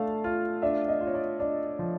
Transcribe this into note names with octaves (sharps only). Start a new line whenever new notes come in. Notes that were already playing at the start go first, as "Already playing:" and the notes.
Already playing: A3 D4 F5 A5
F4
D4 E5
D#5
F4
C#5
D5
D4 D5
F3